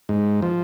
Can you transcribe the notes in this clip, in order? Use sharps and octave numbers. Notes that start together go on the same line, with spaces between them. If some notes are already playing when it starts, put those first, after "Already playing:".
G#2
F3